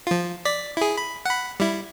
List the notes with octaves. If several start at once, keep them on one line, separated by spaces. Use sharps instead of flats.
F3 F4
D5 B6
E4 G#4
B5
F#5 B5
G3 E4